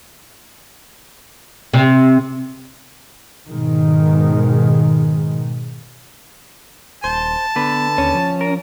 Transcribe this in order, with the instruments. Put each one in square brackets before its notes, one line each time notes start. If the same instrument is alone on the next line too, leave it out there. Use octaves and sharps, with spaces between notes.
[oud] C3
[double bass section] G#2 B2 D#3 G#3
[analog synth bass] D#1 [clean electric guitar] C5 [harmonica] A5
[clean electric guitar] D3 B4 [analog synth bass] B3
[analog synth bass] D#2 [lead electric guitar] C#4
[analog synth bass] F3
[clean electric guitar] A#4